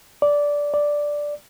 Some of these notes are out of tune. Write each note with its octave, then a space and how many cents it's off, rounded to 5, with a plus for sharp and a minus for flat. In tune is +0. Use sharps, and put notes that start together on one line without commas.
D5 -10
D5 +0